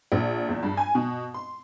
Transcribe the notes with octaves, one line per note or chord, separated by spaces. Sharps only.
A#1
E2
G2
G#5
B2
C6